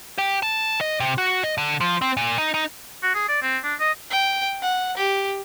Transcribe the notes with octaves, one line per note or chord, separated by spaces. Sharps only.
G4
A5
D#5
C3
F#4
D#5
D3
F3
C4
A#2
D#4
D#4
F#4
G#4
D5
C4
D4
D#5
G5
F#5
G4